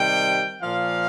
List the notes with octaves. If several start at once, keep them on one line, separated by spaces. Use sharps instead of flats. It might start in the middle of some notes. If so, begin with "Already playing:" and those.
Already playing: C3 D#3 G3 G5
A#2 F3 F5